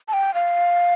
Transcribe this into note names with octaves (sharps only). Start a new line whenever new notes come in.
A5
G5
F5